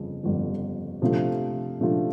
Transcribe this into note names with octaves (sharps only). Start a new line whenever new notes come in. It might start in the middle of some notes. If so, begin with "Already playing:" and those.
Already playing: G1 F2 C#3
G1 F2 C#3
C3 F3 A3 D4 F4
C3 F3 A3 D4 F4